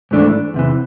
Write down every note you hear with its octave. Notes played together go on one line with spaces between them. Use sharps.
G#2 E3 A3 D4
E2 C3 E3